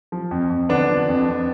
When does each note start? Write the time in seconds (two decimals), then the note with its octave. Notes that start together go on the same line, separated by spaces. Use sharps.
0.12 F3
0.31 F2
0.50 F2
0.69 D3 B3 D4
0.89 F3
1.09 F2
1.28 F2